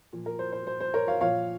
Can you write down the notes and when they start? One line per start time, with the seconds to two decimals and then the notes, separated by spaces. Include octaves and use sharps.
0.13 A#2 F3
0.26 A#4
0.39 C5
0.52 C5
0.67 C5
0.80 C5
0.94 A#4 C#5
1.07 C#5 F5
1.21 A#2 F3 C#5 F5